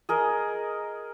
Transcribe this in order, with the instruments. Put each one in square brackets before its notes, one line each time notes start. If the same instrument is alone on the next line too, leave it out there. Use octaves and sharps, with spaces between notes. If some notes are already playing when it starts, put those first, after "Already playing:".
[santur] G#4 A#4 D#5